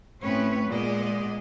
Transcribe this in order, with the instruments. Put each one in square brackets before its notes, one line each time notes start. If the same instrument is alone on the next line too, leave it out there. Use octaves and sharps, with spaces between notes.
[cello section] A2 C4 C#4 B4 C#5
A#2 G#3 B3 G#4 D5 D#5